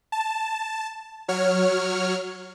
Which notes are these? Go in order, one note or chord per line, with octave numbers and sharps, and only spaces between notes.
A5
F#3 C#5 F6